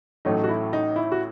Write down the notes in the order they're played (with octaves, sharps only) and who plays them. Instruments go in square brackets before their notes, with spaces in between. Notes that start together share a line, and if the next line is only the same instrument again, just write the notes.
[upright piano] A1 A2 F#3 A3 [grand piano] D#4
[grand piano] F#4
E4
D#4
E4
F#4